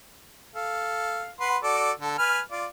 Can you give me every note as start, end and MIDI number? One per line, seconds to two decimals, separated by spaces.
0.55 1.29 69
0.55 1.29 77
1.40 1.57 71
1.40 1.57 78
1.40 1.57 84
1.63 1.91 66
1.63 1.91 69
1.63 1.91 74
2.00 2.18 50
2.00 2.18 69
2.18 2.40 71
2.18 2.40 80
2.18 2.40 89
2.51 2.66 65
2.51 2.66 74